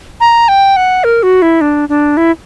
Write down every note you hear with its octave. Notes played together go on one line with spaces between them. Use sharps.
A#5
G5
F#5
A#4
F#4
E4
D4
D4
E4